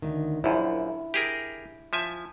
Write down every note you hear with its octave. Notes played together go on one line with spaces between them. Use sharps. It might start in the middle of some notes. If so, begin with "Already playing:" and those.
D2 D#3
A#1 F#2 E4
G4 G#4 A#4
F3 E5 G#5